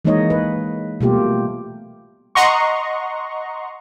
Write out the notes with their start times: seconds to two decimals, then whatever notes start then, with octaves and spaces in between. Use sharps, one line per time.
0.05 E3 G#3 A#3 D#4 C#5 D#5
0.30 B4
1.01 B2 G3 A3 A#3 F4 G4
2.35 D#5 F#5 A#5 C6 C#6